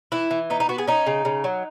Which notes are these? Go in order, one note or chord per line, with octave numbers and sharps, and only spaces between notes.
E3 E4
E3
B3 D#4
D#4
B3 F#4
G#4
C#4 D#4
C#3
C#3
F#3